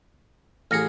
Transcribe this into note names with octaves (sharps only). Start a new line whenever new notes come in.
A1 G#4 F6 A#6 C#7